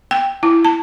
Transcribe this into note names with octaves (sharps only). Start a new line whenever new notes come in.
G5
E4
A5